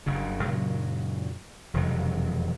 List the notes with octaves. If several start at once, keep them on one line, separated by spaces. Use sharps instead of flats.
F#1 G2 C#3
F#2 A#2 C#3 F#3
E1 F2 C3 F#3